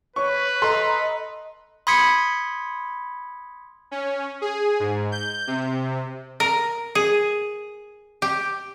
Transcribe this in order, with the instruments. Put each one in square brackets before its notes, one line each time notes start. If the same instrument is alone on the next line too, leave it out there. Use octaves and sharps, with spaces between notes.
[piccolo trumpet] B4 [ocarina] C#5 [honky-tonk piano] C#6
[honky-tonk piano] A4 A#5 C6 [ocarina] D#5
[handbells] B5 C6 D#6 G#6 B6 C#7
[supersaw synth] C#4
G#4
G#2
G6
C3
[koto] A#4
G#4
G4